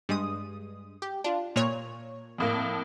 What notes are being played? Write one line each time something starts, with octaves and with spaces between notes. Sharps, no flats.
G2 G#3 D#6
G4
D4 F4
A#2 C#5 F7
F2 A2 A#3